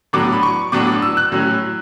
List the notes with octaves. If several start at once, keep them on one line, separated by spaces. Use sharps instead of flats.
A2 F#3 B3 D4 D6
B5
C#6
A2 F#3 B3 D4 D6
D6
E6
F#6
A2 F#3 C#4